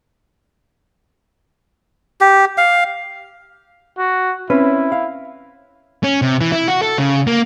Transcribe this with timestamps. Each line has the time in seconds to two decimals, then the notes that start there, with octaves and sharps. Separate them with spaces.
2.21 G4
2.58 F5
3.98 F#4
4.50 C4 C#4 E4 B4
4.92 F5
6.04 C#4
6.22 C3
6.41 E3
6.52 E4
6.68 F#4
6.82 A4
6.99 C#3
7.27 A#3